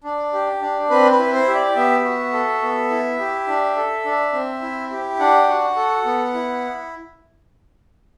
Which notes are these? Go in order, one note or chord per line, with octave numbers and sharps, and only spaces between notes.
D4
G4
D4
C4 B4
B4
E4
C5
G4 E5
D5
B3 E5
F#4
A4
B3
E4
G4
D4
A4
D4
C4
E4
G4
D4 F#5
F#4
A4
B3
E4